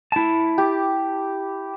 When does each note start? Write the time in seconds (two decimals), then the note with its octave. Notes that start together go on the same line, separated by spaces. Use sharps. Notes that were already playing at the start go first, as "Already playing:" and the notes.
0.12 E4 A5
0.58 G4